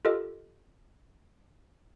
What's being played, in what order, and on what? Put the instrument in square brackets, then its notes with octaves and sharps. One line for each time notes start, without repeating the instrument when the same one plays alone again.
[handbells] F4 G4 A4 A#4 D#5